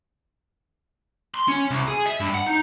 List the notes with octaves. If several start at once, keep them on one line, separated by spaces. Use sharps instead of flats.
C6
C#4
C2
G#4
E5
G2
F#5
D#4